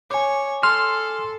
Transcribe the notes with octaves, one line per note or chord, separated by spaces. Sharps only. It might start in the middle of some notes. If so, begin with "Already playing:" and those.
C#5 G#5 D6
A4 C6 F6